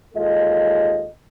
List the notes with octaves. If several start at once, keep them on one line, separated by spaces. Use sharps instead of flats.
D#2 G#3 F4 A4 D#5